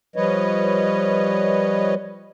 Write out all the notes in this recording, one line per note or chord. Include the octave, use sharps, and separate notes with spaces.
F3 G3 B4 C#5 D#5